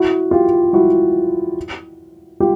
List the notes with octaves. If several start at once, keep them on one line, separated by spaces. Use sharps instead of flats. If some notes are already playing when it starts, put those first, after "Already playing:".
Already playing: E4 F#4
F4 G4
E4 F#4
F4 G4